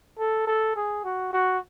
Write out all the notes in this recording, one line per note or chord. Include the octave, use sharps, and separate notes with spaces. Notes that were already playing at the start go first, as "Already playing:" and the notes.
A4
A4
G#4
F#4
F#4